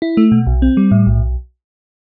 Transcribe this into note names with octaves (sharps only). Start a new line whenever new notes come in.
E4
A3
B2
B1
C4
G3
A2
B1